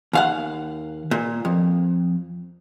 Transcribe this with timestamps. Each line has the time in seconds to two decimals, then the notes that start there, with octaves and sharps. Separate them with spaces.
0.13 D#2 F5 F#5
1.11 A#2
1.45 F2